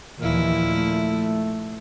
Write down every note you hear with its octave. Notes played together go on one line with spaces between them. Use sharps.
D#2 A#2 E3 F3 E4
A3